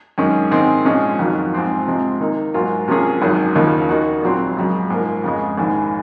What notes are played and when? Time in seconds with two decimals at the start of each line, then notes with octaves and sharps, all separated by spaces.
0.18 F#2 D#3 G#3 C#4
0.51 G#2 D#3 G#3 C4
0.85 A#2 F3 G#3 C#4
1.19 F2 D#3 F#3
1.53 G#2 F3 C4 F4
1.87 C3 F3 G#3 C4
2.20 D#3 A#3 D#4
2.54 G#2 F#3 A#3 F4
2.88 C3 F3 A#3 C#4 G#4
3.22 G#1 F#2 D#3
3.55 D#2 C#3 F3 A#3 D#4
3.89 D#3 A#3 D#4 F#4
4.22 A#1 A#2 F#3 C4 F4
4.57 F#2 C#3 G#3
4.90 G#2 F3 A#3
5.24 F2 C#3 G#3
5.57 A#1 G#2 D#3